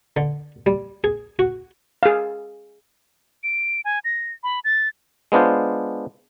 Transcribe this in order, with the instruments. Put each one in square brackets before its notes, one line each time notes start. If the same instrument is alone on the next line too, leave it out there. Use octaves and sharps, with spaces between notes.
[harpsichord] D3
G3
G#4
F#4
[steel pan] G#4 F5
[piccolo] D7
G#5
A#6
B5
A6
[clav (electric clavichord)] G#3 B3 D4 F4 C5